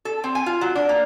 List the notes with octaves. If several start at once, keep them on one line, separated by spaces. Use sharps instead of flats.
A4
C4
G#5
F4
F#3
D4
A#3